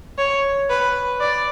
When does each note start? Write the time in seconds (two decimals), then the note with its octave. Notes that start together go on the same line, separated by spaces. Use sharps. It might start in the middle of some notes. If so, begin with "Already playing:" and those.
0.18 C#5
0.70 B4
1.21 D5